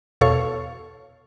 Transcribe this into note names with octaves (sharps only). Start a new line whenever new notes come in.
E2 B2 A4 C#5 F5 C#6